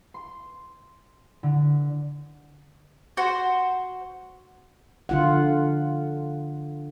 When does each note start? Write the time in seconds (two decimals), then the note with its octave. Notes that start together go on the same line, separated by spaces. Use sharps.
0.14 C6
1.43 D3
3.17 F#4 C5
5.09 D3 F4 F#5